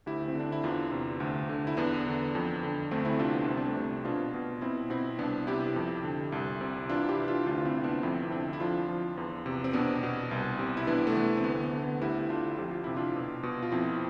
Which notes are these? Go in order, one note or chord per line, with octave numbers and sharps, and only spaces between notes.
D2 E4 G4
C4
D3 D4
E4
E2 D4 F4
C3
D2
D3
E4
E2 B3 D4
D3
F2
D3
D2 A3 C4
C4 E4
C3 D4 F4
B3 D4
C2 C4
D4
A3 C4
C3
B2 D4 F4
B2
B2 C4 E4
B2 C4 E4
C2 B3 D4
C3 E4 G4
F2
D3
C2
C3
E3 D4 F4
E4 G4
E3
D4 F4
D2 D4 F4
F4
C4 E4
C3
B3 D4
F2 C4 E4
D3 C4 E4
E4
F3 D4 F4
F3
E2
C3
C4
B2 B3 D4
B2
C2
C3
E4
E3 B3 D4
A3
E3 B3
C4
D2 B3
B3
D3
B3
D2 E4 G4
D3 D4 F4
F2 G4
F4
C3 E4
D4 F4
B2
B2
F4
F2 C4 E4